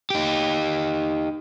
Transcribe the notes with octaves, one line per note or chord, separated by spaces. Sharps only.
D#4 G4